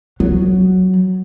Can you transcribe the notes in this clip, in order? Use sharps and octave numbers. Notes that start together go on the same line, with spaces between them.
F#3